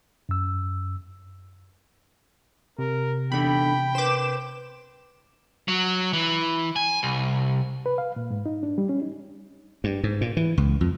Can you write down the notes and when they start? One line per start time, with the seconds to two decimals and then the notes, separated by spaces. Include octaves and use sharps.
0.29 F#2 E6
2.79 C3 A#4
3.32 E2 D3 G5 B5
3.95 B4 C5 D6 E7
5.68 F#3
6.13 E3
6.76 G#5
7.03 C2
7.86 B4
7.98 F5
8.16 A#2
8.31 G#2
8.46 D#4
8.63 D4
8.78 G3
8.89 C#4
9.02 D#4
9.84 G2
10.04 G#2
10.21 A#2
10.37 E3
10.57 C#2
10.81 F2